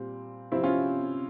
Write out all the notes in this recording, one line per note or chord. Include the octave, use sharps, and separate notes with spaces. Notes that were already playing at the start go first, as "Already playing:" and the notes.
Already playing: A#2 G3 C4
C3 F3 C4 E4
C#4 F4